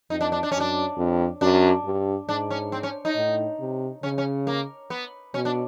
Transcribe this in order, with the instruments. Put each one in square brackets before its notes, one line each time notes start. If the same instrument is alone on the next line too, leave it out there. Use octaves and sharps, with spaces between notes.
[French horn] F2 [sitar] D#4
[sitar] D4
D4
D4
[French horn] F#2 [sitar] C#4
[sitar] D4
[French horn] F2
[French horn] F#2 [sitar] D4
[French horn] G2
[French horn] G#2 [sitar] D4
[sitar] C#4
C4
C#4
D#4
[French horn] A2
C3
[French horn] C#3 [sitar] C#4
[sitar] C#4
A#3
B3
[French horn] B2 [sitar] C#4
[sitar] D4